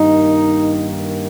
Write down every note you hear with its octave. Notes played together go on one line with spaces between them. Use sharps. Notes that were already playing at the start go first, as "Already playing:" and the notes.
Already playing: G2 D#3 A#3 D#4